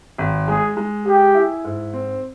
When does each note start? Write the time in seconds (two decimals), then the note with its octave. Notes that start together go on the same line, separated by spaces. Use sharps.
0.18 G#1
0.48 G#3 G#4
0.77 G#3
1.06 G4 G#4
1.34 E4
1.65 G#2
1.94 C4